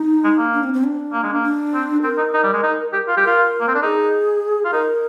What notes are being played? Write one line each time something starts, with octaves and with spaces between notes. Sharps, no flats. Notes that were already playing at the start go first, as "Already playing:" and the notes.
Already playing: D#4
G#3
A#3
D4
C4
C4
D4
A#3
G#3
A#3
D4
C4
C4 A#4
D#4
D#4
G3
G#3
D#4
G4
F4
G4
F4 A#4
A#3
C4
D4
D#4 G#4
F4
D#4 A#4